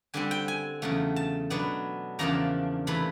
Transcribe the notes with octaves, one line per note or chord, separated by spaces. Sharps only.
D3 G3 C4 G#5
G5
G#5
E2 C#3 F#3 A3
A5
B2 F#3 B3 D4
E2 C#3 F3 A#3 D4 A#5
C3 E3 A3 B5